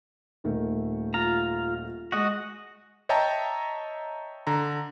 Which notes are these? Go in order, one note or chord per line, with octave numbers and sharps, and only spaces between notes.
D#1 D#3 A3
F4 A#5
G#3 F#4 D#5
C#5 D#5 E5 G5 A5 A#5
D3 A#5